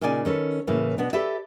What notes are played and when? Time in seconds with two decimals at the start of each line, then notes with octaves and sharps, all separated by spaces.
0.01 A#2 C#3 D#4 D5 G5 G#5
0.25 D#3 C#4 A4 B4
0.67 A2 C#3 E3 A#3
0.98 B2 B3 D4
1.13 G4 A4 B4 D5 E5